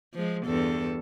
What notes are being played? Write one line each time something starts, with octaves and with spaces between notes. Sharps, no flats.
F3 G#3
E2 G2 A4